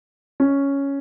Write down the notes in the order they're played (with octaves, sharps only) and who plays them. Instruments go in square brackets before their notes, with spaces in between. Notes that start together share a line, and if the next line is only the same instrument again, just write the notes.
[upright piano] C#4